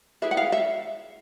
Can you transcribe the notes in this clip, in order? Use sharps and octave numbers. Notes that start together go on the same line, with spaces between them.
E4 G#4 B4 E5
F#5
F5
E5